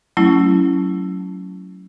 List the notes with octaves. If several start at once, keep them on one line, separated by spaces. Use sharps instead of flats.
F#3 A3 C#4 E4